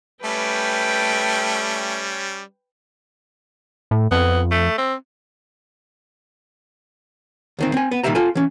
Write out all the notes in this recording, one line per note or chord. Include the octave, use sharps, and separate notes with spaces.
G3 A3 C#4 B4 G5
A2
F2 B3
A3
C4
D2 D#3 C4
C4 G#5
B3
A#2 D#3 E3 G3 E5 A#5
F4 A4 G#5
E3 C#4